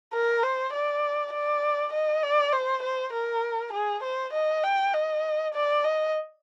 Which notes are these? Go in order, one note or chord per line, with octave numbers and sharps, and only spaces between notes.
A#4
C5
D5
D5
D#5
D5
C5
C5
A#4
G#4
C5
D#5
G5
D#5
D5
D#5